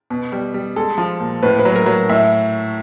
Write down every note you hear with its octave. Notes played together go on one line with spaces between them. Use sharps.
B2
G3
G3
G#3 A4
F3
A#2
A2 B4
B4
F#3
A#4
F#3
A2 E5